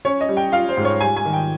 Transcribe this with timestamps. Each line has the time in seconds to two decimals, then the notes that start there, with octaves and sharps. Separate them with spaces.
0.05 C#4 C#5
0.21 D#5
0.29 G3
0.37 G5
0.52 F4 F5
0.69 C5
0.77 G#2
0.85 C#5
1.00 G3 G#5
1.16 G#5
1.25 D#3
1.33 G5